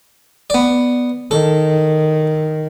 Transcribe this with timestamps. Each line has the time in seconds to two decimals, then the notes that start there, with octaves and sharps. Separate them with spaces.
0.50 B3 D5
1.31 D#3 A4